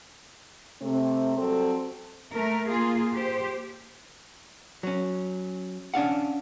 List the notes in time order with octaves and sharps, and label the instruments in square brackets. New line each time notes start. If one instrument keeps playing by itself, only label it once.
[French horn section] C3 A3 C4
F#3 G3 C4 A4
[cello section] A3 A#4
A#3 F4 G#4
G4 C5
[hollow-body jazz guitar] F#3 C#4
C#4 D4 F5 F#5